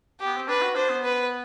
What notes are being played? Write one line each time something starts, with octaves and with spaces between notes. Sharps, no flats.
G4
B3
C4
D4 B4
F#4
D4 C5
B3
B4